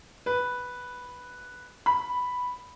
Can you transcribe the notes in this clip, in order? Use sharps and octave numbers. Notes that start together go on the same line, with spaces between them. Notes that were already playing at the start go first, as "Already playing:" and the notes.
B4
B5